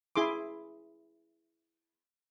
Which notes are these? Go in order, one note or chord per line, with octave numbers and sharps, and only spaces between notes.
E4 G#4 C6 D6